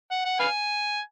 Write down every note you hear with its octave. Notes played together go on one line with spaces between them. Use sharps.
F#5
F#5
B4 F5 G#5